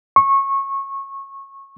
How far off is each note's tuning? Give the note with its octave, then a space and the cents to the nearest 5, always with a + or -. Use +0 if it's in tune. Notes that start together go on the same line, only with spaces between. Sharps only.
C#6 -20